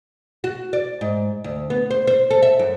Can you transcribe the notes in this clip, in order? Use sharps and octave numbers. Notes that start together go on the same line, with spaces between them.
F#4
D5
G#2
D2
B3
C5
C5
A4
E5
F#2